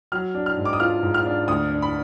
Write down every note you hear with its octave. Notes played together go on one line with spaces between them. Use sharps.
F#3 F6
D4
F6
G#2
D6
D#6
F4 F6
G#2
F6
D4
D2 D#6
D4
B5